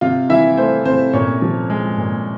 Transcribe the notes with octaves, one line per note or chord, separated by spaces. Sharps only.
C3 F4 F5
E3 E4 E5
A3 C5
C3 C5
A#2 C#4 C#5
F3
G#3
A#2